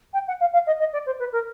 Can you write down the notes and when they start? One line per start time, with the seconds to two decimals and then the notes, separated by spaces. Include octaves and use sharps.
0.13 G5
0.27 F#5
0.40 F5
0.53 F5
0.66 D#5
0.79 D#5
0.93 D5
1.06 C5
1.19 B4
1.32 A#4